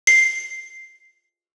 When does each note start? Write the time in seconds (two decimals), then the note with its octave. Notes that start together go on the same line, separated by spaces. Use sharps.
0.07 C7